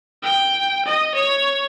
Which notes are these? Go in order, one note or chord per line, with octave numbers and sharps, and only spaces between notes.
G5
D#5
C#5